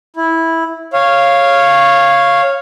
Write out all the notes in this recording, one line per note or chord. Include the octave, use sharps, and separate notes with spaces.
E4
C#5 F5